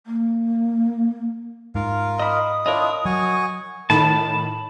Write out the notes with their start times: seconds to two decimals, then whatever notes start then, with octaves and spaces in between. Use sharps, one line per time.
0.06 A#3
1.75 G#2 F4 A#4 F5
2.19 D#5 B5 D#6
2.66 D4 E4 F4 A#4 C#5 D#5
3.05 F#3 F#4 G#5 C#6
3.90 A2 D#3 A5 B5